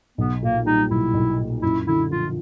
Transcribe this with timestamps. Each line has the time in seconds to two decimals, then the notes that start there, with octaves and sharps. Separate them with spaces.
0.18 B1 B3
0.42 A#2 A#3
0.66 G3 D#4
0.91 B1 E4
1.14 B1
1.39 A#2
1.62 F#2 E4
1.87 D3 E4
2.10 F3 F4